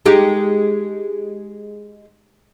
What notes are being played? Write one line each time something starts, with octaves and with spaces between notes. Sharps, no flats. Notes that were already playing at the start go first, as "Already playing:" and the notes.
G#3 D#4 G4